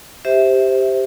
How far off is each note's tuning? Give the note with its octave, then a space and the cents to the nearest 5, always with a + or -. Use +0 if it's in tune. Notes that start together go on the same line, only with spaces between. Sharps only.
G4 +0 C5 +0 E5 -15